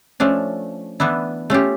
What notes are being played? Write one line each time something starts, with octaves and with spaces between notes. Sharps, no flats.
F3 A3 C#4 D4
E3 B3 D4 E4
A3 C#4 F4 G4